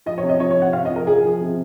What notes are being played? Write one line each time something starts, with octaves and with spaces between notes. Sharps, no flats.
F3 D#5
C#5
C3
D#5
F3 C#5
C#5
C3 F#5
C3 F5
D#5
F3
A#4
F3 G#4
F3
C3